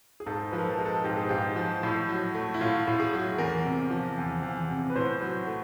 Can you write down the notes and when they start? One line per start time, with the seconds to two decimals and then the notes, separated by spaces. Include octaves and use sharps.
0.20 G#4
0.26 G#2 A4
0.51 F3 B4
0.58 A#4
0.65 A4
0.78 G#3
0.85 A4
1.04 G#2 G4
1.17 G#4
1.29 G#2 G4
1.56 F3
1.83 A2
2.09 F#3
2.35 A3
2.54 E4
2.61 A2 F4
2.87 A2
3.00 G#4
3.13 F#3
3.38 E2 A#4
3.65 C3
3.90 F3
4.17 E2
4.43 E2
4.70 C3
4.90 B4
4.96 A2 C5
5.21 F#3
5.47 A3